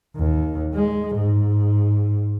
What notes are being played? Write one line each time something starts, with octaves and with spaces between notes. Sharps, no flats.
D#2
G#3
G#2